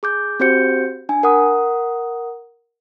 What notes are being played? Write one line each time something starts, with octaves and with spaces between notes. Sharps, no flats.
G#4 D6 G6
C4 F#4 G4 C5 G6 C#7
D4 G#5
A#4 F#5 D#6